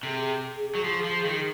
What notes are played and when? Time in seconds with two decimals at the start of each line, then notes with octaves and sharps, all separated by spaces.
0.03 C3 A4
0.08 G#4
0.75 F#3
0.84 F3
1.04 F3
1.25 D#3